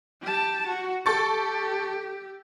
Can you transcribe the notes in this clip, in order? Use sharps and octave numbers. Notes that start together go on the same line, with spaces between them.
G4 A5
F#4
G4 A4 C#6 A6